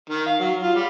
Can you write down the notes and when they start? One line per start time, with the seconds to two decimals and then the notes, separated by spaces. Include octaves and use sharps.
0.10 D#3
0.26 F5
0.40 F#3
0.62 F4
0.76 G3